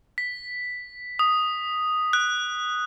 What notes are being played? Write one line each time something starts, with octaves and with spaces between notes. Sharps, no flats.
B6
D#6
F#6